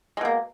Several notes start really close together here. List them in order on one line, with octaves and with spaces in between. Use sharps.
G#3 B2 A#3